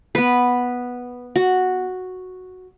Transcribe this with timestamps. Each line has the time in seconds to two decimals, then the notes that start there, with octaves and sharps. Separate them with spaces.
0.15 B3 B4
1.36 F#4